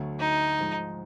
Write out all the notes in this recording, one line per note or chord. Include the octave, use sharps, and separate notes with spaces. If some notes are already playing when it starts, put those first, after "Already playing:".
Already playing: D2 D3 F#3 A3
D#4
G#2 F3 G#3